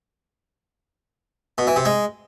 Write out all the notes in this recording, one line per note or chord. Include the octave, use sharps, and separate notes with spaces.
B2
E3
C3
G#3